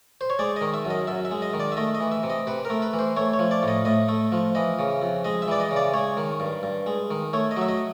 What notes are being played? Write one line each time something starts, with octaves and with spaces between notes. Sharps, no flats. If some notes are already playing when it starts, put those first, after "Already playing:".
C5
C#5
G#3 D5
D#3 D#5
E5
F#2
D#5
F#2 E5
E5
G#3
D#5
D#3
D5
E5
A3 D#5
D#5
E3
E5
C3
D#5
C3 B4
A#4
A3
B4
E3
C5
A3 C#5
C#5
F3
D5
A2 D#5
A2 D#5
A3
F3
E3 D#5
C#3
F2
G#3 D#5
E5
E3 D5
D#5
C#3
D5
G#3 C#5
D#3
G2
G2
G#3
D#3
A3 C#5
D#5
F#3 E5
D#5